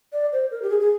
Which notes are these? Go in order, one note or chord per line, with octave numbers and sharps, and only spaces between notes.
D5
C5
A#4
G4
G#4
G#4